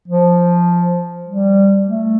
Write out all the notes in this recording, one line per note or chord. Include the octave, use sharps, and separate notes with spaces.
F3
G3
A3